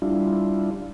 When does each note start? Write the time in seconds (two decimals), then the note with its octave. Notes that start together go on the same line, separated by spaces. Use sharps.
0.02 G3 D4 E4 F4